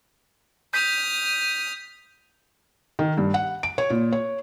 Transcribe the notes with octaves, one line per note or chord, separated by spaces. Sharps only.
D#6 F6 G6 B6
D#3
G2
F#5
D7
C#5
A#2
C#5